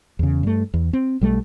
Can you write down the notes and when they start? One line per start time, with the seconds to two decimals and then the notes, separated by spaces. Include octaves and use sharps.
0.19 E2 C#3
0.43 G2 A3
0.74 E2
0.93 C4
1.21 B1 G3 A3